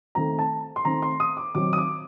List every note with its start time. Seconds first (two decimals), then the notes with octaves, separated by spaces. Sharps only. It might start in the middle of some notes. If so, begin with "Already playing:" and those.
0.15 D#3 A3 C4 A#5
0.39 A5
0.76 C6
0.85 D#3 A3 C4 A#5
1.02 C6
1.20 D#6
1.37 D6
1.55 D#3 F#3 C4 D#4 D6
1.73 D#6
1.78 D6